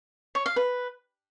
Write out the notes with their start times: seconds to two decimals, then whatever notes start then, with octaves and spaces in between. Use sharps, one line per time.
0.35 C#5
0.46 F5
0.56 B4